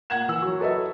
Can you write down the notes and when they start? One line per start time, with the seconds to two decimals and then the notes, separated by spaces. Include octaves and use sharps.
0.10 A#3 F#5 G#6 E7
0.28 E3 E6
0.42 F#3 F#4
0.60 F#4 A4 B4 D#5 E5